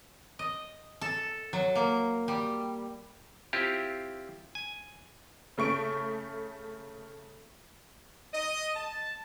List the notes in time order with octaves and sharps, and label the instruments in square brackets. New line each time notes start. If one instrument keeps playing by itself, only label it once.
[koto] D#5
A4
F#3
A#3
G3
[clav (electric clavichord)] C4 E4 F4 G4
G#5
[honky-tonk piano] C#3 A3 C#6 D7
[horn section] D#5
A5